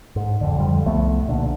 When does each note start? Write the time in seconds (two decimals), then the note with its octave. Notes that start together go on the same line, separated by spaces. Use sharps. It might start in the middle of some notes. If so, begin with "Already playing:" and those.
0.16 G#2
0.41 D#1 F2 D3
0.58 F2 D3 F3 G3
0.86 C2 F3 A3 B3
1.28 B1 A#2 D3